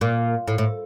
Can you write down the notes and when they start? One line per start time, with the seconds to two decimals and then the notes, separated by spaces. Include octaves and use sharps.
0.01 A#2
0.48 A2
0.58 A2